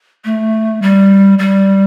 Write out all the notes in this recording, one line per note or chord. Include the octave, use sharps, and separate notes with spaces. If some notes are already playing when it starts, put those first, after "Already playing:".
A3
G3
G3